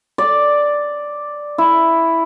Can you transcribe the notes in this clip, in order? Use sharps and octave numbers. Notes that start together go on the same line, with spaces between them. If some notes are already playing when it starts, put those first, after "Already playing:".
D5
E4